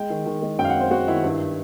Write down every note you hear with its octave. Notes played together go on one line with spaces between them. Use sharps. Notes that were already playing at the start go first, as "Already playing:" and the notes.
Already playing: G#3 G5
D#3
D#3
G#3
F#2 G5
F5
F#5
C4
C5
G#3 F#4
D#3 E4
G2